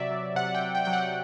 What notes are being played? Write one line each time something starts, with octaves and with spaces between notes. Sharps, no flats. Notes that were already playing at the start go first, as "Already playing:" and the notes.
Already playing: C3 F#3 D5 E5
F#3
C3 F#5
G5
C3
G5
F#3 G5
F#5